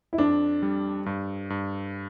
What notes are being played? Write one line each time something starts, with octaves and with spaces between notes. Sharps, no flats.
E4
F2 D4
G3
G2
G2